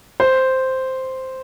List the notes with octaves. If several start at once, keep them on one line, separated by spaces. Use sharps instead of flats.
C5